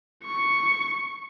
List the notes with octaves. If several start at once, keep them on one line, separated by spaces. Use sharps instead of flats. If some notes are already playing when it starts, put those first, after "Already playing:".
C#6